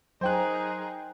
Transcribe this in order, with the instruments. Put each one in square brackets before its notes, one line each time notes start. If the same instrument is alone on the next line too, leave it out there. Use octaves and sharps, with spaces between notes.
[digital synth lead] F#3 [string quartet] D#4 G#4 A#4 [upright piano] C5 G5 F#6